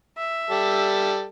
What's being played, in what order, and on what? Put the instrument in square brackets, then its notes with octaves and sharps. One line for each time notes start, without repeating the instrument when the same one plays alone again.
[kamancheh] E5
[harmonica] G3 A4